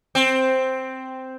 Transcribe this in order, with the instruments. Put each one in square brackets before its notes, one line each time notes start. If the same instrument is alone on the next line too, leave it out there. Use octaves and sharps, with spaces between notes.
[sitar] C4